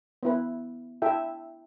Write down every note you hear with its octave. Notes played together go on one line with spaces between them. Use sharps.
B3 E4 B4
E4 A4 E5 G5